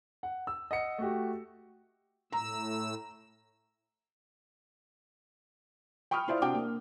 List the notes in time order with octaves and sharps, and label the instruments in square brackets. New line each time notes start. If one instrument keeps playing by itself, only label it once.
[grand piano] F#5
E6
D#5 F#5 C#7
A3 F#4 G4
[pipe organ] A2 E6 [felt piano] A#5
[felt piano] G5 B5 C#6 D#6 F6
E4 F4 C5 D5 E5 F5
C3 D4 F#4 G5 D6
A#3